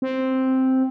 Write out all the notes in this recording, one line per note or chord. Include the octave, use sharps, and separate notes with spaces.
C4